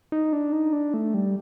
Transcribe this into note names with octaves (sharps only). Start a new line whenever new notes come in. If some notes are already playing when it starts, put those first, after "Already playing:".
D#4
D4
D#4
D4
A3
G3